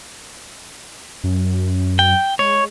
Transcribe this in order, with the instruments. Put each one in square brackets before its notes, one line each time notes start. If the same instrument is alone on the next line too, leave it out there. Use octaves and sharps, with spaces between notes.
[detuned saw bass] F#2
[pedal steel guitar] G5
[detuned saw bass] G#3 [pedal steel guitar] C#5